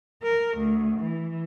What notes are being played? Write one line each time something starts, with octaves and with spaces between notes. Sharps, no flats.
A#4
D2
E3